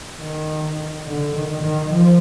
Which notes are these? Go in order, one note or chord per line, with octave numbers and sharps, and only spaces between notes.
D#3
D3
D#3
D#3
F3